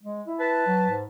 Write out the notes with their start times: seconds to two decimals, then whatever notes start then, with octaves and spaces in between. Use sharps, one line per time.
0.03 G#3
0.27 E4
0.40 B4 A5
0.66 F#3
0.89 G#2